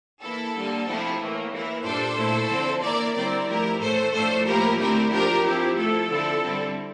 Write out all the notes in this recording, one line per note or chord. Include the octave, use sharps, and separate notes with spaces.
E3 A#3 E4 A4
D3 G3 A#3
C3 F3 A3 E4
A2 E3 A#3
E3 A#3 E4
A#2 G3 D4 A4 C5
A#2 A3 E4
D3 F3 C4 E4
E3 A#3 E4 A#4 D5
D3 G3 C4 E4 A#4 D5
F3 A3 E4 G4 A#4
A2 E3 A3 A4 C5
A2 F3 A3 D4 A4 C5
A2 F3 A#3 E4 G4 A#4
D3 A3 C4 E4 G4 A#4
F3 A#3 D4 G4 A#4
F3 C4 E4 G4
F3 A3 E4 A4
D3 F3 C4 E4
D3 G3 C4 E4